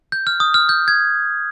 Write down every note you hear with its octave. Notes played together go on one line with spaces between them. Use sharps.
G6
F6
D#6
F6
G6
G#6